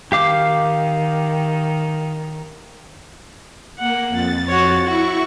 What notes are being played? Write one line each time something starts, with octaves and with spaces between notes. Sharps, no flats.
D#3 G4 F5 D6
A#3 F#5
F2 A6
F#4 C#5
E4 F#4 C#6